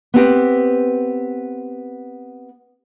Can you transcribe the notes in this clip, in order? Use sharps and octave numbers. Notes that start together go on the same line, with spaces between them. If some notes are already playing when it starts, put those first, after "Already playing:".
B3 C4 G4 B4